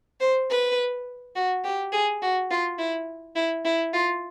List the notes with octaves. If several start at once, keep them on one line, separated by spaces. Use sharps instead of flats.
C5
B4
F#4
G4
G#4
F#4
F4
E4
E4
E4
F4